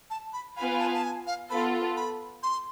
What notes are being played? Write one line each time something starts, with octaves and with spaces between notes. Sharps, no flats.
A5
B5
B3 F4 B4 F5 G#5 B5
A5
A5
G#5
F5
B3 F4 A4 B5
B5
C6